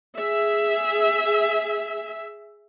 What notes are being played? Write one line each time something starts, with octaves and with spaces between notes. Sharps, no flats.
G#4 E5